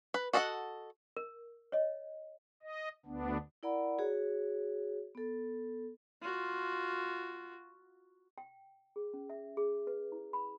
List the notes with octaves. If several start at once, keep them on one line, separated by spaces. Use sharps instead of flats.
B4
F#4 A4 D#5 F5 F#5
A#4
C#5 D#5
D#5
D2 B3 D4
E4 A#4 D5 F#5 A#5 B5
F#4 G#4 C#5
B3 A4
F4 F#4
G5
G#4
C#4
E5
G#4
B4
E4
B5